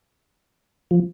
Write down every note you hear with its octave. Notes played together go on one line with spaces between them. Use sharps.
F3